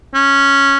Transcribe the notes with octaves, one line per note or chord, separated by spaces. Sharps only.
C#4